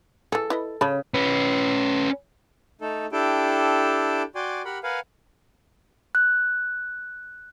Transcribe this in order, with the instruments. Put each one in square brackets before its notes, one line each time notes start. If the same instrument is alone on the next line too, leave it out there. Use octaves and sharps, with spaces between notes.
[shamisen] E3 G#4 [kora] A4
[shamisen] E4 B4 D#5
[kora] C#3 [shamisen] C#5 A5 B5
[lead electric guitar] C#4 B4
[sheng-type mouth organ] A3 D#4 A4
D4 E4 G4 A4 G5
F#4 D5 G5 G#5 C6
G4 A#4 F#5 B5
A#4 B4 F5 F#5 G#5
[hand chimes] F#6